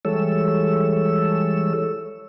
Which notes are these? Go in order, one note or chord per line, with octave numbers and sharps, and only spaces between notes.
E3 G3 G#3 A4 C#5 E6